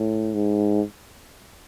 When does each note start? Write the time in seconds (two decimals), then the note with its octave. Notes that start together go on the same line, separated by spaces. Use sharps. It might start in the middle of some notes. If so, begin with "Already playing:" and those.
Already playing: A2
0.34 G#2